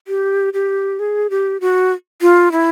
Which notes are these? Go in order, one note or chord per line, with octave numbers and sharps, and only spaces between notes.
G4
G4
G#4
G4
F#4
F4
E4